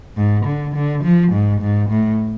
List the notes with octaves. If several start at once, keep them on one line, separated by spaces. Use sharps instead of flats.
G#2
D3
D3
F3
G#2
G#2
A2